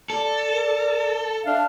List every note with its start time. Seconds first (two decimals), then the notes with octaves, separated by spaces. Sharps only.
0.10 A4 D5
0.52 A#4
1.45 D4 E5 F5